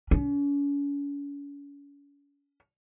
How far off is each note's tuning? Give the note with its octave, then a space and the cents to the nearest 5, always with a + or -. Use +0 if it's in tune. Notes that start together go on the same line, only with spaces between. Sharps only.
C#4 +40